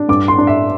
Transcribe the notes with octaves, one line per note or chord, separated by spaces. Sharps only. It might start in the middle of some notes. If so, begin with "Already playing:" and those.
Already playing: D4
G2 D6
C6
D4
E5